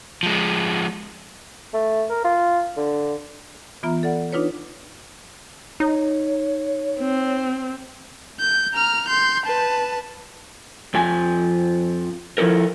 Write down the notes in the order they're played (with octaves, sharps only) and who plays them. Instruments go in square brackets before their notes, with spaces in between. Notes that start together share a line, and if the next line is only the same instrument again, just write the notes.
[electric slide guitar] F3 G#3
[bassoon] A3
A#4
F4
D3
[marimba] E3 B3 F4 E5 A#5
A4 D5 F#5
D4 D#4 F4 B4 C#5
[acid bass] D#4 [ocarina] C#5
[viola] C4
[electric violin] G6
A#5 F6
C6 G6
B4 A5
[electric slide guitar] F2 F3 G#5
F3 G#3 E4 A4 A#4